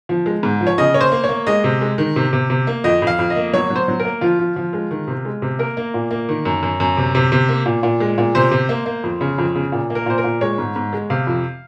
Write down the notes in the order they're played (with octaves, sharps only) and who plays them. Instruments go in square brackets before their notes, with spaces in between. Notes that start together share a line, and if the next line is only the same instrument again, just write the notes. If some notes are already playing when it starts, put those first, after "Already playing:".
[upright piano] F3
G#3
G#2
F3
C#5
C#3 D#5
A#3 C#5
C5
A#3
C#5
A#3
G#3 D#5
C3
G#3
D#3
C3
C3
C3
A#3
F2 D#5
F2
F5
F2
D#5
A#3
F#3 C#5
F#3
C5
F#3
A#4
A#3
F3 F4
F3
F3
G#3
D#3
C3
G#3
C3
A#3 A#4
A#3
A#2
A#3
D#3
F#2
F#2
F#2
C3
C3
C3
A#3
A#2
A#2
G#3
A#2
C3 C5
C3
A#3
A#3
F2
C#3
F2
C#3
A#2
A#3
A#4
A#2 C5
A#4
A#2
G#3 C#5
G#2
G#2
G#3
C3 F5
F2